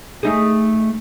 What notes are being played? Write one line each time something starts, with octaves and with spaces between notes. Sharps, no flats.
A3 D#4 G#4